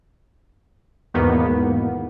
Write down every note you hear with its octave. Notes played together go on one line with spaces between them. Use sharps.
E2 G#2 B2 D#3 A#3 B3